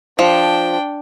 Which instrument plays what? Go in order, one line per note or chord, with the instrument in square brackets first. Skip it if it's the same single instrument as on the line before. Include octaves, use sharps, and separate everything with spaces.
[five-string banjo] F3 [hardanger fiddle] D4 G5